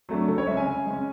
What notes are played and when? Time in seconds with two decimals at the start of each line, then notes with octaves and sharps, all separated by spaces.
0.09 F#3 A3 D4
0.28 C#3 A4
0.38 C#5
0.47 G#3 E5
0.52 C#4
0.57 G#5
0.67 C#3
0.86 G#3 C#4